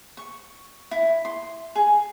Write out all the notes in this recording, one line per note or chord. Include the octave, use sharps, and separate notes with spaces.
C#6
E4
C6
G#4